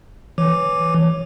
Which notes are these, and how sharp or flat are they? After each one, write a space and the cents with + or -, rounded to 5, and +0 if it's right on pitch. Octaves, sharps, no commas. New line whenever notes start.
E3 +0 C#5 +0 D6 +0